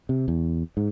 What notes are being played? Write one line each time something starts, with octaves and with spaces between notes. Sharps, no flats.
C3
E2
G#2